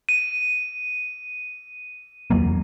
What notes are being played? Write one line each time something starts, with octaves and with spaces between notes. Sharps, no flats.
D#7
E2 F#3 A#3